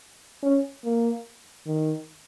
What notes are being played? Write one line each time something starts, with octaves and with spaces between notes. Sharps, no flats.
C#4
A#3
D#3